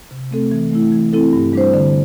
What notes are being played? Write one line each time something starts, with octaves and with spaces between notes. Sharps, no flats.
C3
A3 C4 A4
E3
A3 E4
E3
C4 E4 A4
G2
G3 D4 C5
D3